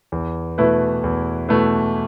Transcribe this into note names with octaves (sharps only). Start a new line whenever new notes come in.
E2
B2 A3 E4 B4
E2
B2 A3 E4 B4